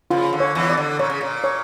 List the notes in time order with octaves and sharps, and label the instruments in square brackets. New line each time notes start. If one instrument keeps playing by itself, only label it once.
[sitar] C#3 [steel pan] F4
[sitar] D3
[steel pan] C#5
[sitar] E2 E3
[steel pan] D5
[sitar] D3
[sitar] A#2 [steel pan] C#5
[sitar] C#3
A#2
[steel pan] C#5